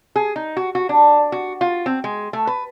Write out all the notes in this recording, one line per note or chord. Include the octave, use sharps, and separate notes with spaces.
G#4
D#4
F#4
F#4
D4
F#4
F4
C4
G#3
A3
B4